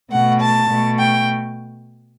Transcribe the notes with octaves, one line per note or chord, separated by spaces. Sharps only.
B2 A3 F#5
A5
B2 A3
G5